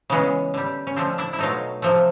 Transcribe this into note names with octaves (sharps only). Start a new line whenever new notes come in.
C#3 E3 G#3 B3 C#4
D3 G3
C#4
D3 F3 A3 C4 D4
D4 E4
E4
B2 F#3 A3 D#4 F4
C3 F3 A3